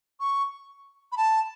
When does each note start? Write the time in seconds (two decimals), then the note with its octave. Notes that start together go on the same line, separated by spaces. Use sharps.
0.20 C#6
1.12 B5
1.17 A5